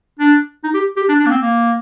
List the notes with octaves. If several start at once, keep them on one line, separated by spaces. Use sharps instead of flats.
D4
D#4
G4
G4
D4
D4
A#3
C4
A#3